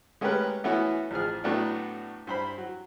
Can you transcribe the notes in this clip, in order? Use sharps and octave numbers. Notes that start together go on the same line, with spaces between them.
G#3 A3 C#4 G4 A#4 B4
E3 A3 B3 C#4 E4 F#4
A1 F3 G#4 F6
A2 F#3 A3 B3 D4 F#4
G2 C5 B5
F#3